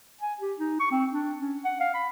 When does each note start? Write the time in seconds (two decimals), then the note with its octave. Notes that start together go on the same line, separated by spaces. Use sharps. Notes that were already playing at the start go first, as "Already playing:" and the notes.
0.21 G#5
0.40 G4
0.59 D#4
0.80 C#6
0.91 C4
1.12 D4
1.41 C#4
1.64 F#5
1.80 F5
1.94 B5